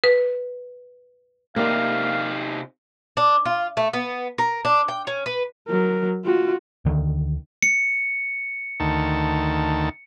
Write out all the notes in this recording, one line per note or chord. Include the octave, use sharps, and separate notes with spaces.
B4
C3 A#3 D#4 G4 D5 F5
D4
F4
A3
B3
A#4
D4
G5
C#4
B4
F#3 A#4
F4 F#4
D2 D3 D#3
C#7
D2 D#3 A5